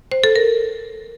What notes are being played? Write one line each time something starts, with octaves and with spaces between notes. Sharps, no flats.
C5
A4
A#4